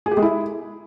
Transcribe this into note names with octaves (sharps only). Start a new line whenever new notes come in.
G#4
G4
G#3
E4